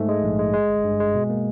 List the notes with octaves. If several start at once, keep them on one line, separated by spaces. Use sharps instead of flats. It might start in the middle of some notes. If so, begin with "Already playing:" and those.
Already playing: G#2 A3
G#3
A#1
G#3
G#3
G1
G2
G#3
B2
A#3